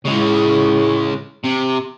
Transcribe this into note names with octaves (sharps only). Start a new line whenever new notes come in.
A2 C#3 G#3
C3